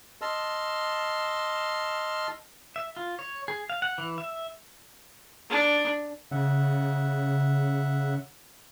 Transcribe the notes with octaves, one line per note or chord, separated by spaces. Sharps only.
D#5 A5 C6 E6 F6
E5
F4
C#5
G#4
F5
F#5
E3
E5
D4
C#3 E5 F#5